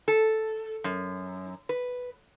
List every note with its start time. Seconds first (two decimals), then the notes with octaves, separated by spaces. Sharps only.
0.08 A4
0.84 F#2
1.69 B4